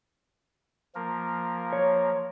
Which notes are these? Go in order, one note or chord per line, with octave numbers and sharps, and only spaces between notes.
F3 A#3 A#4
C#5